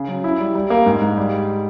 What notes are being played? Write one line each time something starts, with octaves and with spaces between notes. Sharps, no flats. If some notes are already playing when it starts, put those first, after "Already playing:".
Already playing: C#3
F#3
E4
G3
G3
A#3
G#2
G#2
G3